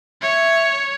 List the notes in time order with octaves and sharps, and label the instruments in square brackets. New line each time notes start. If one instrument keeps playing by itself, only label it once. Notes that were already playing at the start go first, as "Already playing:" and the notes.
[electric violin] C#5 [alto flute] E5